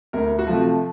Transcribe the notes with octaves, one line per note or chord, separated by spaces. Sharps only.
D2 A#4
F#4
C3 F3 A3 F4